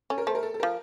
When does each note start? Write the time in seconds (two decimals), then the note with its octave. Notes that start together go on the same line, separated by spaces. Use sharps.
0.10 C#4 A4
0.18 A#4
0.27 A3 C5
0.35 A#4
0.43 A4
0.54 A4
0.60 F3 A#4